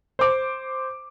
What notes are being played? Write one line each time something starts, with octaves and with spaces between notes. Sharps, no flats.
C5 D6